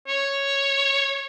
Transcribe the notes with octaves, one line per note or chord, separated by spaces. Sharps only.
C#5